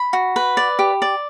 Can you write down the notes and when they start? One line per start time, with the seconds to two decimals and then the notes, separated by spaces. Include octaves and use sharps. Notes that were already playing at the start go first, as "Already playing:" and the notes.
Already playing: B5
0.13 F#4
0.36 B4
0.57 D5
0.79 G4
1.02 D5